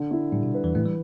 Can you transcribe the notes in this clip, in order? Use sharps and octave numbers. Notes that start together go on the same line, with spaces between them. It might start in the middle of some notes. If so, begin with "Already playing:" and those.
Already playing: D3
E4
A2 G3
B2
B4
E2 E3
A2 E3 A3
G3